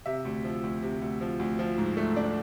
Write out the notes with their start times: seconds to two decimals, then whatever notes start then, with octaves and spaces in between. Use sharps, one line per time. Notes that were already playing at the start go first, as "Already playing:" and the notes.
0.06 C3 E5
0.25 D2
0.44 F3
0.63 D2
0.83 C3
1.02 D2
1.21 F3
1.39 D2
1.59 F3
1.78 G#2
1.97 A3
2.16 D4